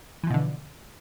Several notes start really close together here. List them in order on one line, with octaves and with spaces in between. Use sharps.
E3 F3 B2 D3